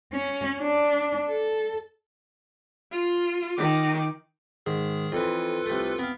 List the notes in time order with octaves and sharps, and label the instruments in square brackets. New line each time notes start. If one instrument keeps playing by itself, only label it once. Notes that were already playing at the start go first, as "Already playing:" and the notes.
[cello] C#4
D4
A4
[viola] F4
D#3 D6
[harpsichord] G#2 [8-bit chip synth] D#3 G#4
[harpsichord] F2 E3 [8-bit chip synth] F4 A4 B4
[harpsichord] C2 A3
[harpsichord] B3 F5 [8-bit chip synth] C4